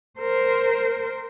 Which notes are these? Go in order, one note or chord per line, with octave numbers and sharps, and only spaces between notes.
A#4 C5